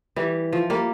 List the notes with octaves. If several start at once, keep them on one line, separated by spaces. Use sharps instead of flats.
E3 G3
F3
G3 A#3